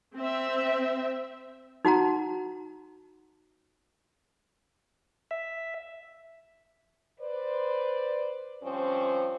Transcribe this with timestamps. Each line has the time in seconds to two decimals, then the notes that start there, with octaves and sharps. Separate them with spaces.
0.16 C4 E5
1.85 D#4 F#4 F#5 A#5
5.31 E5
7.20 B4 C5 D5
8.64 G2 F3 C4 C#4 C5